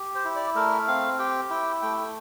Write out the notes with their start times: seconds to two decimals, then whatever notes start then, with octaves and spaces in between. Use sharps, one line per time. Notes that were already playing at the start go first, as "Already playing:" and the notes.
Already playing: G4
0.15 C5
0.25 E4
0.35 D5
0.56 A3 A#4
0.88 C4 F5
1.19 G4 G5
1.50 E4 G5
1.82 A3 G5
1.98 G5